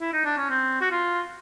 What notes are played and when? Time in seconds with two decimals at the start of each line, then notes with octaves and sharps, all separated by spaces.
0.00 E4
0.13 D#4
0.25 D4
0.37 C#4
0.50 C4
0.81 F#4
0.91 F4